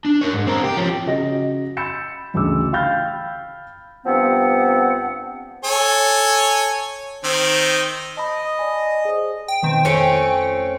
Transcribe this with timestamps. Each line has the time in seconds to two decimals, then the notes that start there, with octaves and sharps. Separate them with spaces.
0.06 D4
0.22 A#4 C#5
0.34 G#2
0.47 C4 A#4
0.63 G4
0.77 F3 C#4
1.06 C#3 F#4 D#5 A#6
1.77 B5 E6 G6 A6 C#7 E7
2.34 A1 D2 C#3 D6 E6
2.73 F5 G5 B5 F6 G6 A6
4.06 G2 F3 B3 C4 F#5
5.64 A4 C#5 G#5
7.24 D#3 C4
8.17 D#5 A5 B5 D#6
8.59 D5 G#5
9.05 G#4 C5
9.48 G5
9.63 B2 D#3 C4
9.85 F2 A3 C4 C#4 C#7